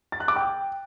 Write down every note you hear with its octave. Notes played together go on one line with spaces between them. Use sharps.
A6
F#6
D6
G5